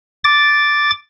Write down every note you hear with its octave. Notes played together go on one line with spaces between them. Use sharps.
D6 A6